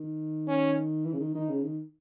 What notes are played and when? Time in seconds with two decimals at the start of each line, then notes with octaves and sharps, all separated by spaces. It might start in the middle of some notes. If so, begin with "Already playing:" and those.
Already playing: D#3
0.48 C#4
1.05 E3
1.13 C#3
1.20 D#3
1.34 D#3 D#4
1.49 C#3
1.63 D#3